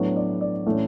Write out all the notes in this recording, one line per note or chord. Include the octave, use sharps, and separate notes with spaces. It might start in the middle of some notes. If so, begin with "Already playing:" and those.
Already playing: A2 F#3 B3 D4 C#5
D5
D5
A2 E3 A3 C#4 E4